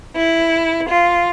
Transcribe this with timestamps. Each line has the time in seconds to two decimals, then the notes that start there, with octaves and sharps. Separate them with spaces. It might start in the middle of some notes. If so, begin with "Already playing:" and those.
0.16 E4
0.89 F4